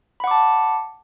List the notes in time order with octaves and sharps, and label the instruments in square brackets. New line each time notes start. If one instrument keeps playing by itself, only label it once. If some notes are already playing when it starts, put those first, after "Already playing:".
[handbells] B5
F#5
D6
A5